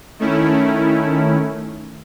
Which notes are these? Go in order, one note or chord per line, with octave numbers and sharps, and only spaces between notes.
D#3 A3 C#4 E4